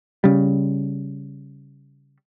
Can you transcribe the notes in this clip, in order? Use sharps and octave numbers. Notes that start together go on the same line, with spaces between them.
C#3 G3